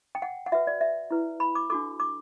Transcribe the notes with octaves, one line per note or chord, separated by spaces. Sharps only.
G5
F#5
F#5
F#4 B4 E5
D5
E5
E4 B4
B5
D6
D4 F#4 A4 D6
D6